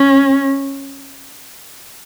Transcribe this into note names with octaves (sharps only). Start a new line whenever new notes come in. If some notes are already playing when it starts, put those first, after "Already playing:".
Already playing: C#4